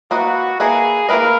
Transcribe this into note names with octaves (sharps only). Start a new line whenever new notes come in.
A#3 E4 F#4 B4 D#5
A#3 E4 G#4 B4 D#5
A#3 E4 A#4 B4 D#5